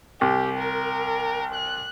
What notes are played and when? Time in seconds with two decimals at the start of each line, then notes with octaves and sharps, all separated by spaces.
0.21 C2 G4
0.59 A#4
1.55 F#6